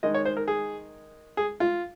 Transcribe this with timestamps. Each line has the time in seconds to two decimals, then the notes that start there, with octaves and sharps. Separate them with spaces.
0.03 D#3 G#3 D#4 D#5
0.14 C#5
0.25 C5
0.37 A#4
0.48 G#4
1.37 G#4
1.60 F4